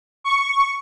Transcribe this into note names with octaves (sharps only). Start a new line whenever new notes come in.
C#6